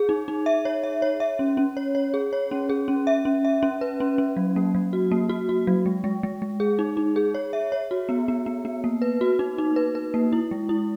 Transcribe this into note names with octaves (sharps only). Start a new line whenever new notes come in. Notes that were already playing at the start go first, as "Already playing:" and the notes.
Already playing: G#4
D#4
D#4
E5
C#5
E5
C#5
E5
C#4
C#4
C#5
C#5
G#4
C#5
C#4
G#4
C#4
E5
C#4
E5
C#4
B4
C#4
C#4
F#3
A#3
F#3
F#4
A#3
F#4
F#4
F#3
G#3
G#3
G#3
G#3
G#4
D#4
D#4
G#4
C#5
E5
C#5
F#4
B3
B3
B3
B3
A#3
B4
F#4
D#4
D#4
B4
B4
A#3
E4
G#3
E4